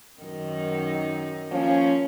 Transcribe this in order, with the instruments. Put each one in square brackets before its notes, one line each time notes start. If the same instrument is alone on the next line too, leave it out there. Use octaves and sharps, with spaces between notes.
[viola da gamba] F#2 D#3 D#4
[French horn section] F3 A#3 C#4